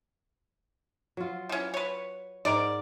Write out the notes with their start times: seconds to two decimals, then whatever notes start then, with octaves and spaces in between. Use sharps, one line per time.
1.17 F#3 F4
1.49 E3 C#4
1.74 B4 C#5
2.45 G#2 A#4 D5